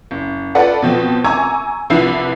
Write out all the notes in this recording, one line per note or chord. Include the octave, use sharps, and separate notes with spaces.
F#1
F4 A4 B4 D5 F#5
B2 F3 C4
G#5 A#5 C#6 D6 E6 G#6
C2 F3 D4 E4 B4 C7